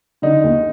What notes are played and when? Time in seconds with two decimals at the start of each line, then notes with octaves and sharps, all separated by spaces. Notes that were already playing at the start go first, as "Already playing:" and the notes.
0.22 D3 D#4
0.44 D#2